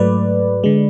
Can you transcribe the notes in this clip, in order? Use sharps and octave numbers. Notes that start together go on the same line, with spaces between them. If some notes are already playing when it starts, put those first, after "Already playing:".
Already playing: G#2 F#3 A3 B4 D5
D3 G#3